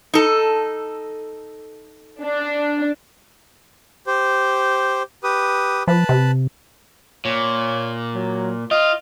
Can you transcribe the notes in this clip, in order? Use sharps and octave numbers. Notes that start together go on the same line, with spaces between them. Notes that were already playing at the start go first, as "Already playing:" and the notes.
D#4 A4
D4
G4 C5
G4 B4 D#6
F3 B4 A5 B5
C3
A#2 C#5
F#3
F4 D#5